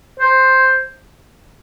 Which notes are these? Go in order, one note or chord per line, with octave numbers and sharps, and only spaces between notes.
C5